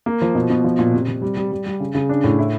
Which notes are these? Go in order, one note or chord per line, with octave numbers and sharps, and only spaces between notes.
A#3
F3
B2
B2
F3
A#2
C3
C3
G3
G3
G3
G3
C#3
C#3
D4
A2
E4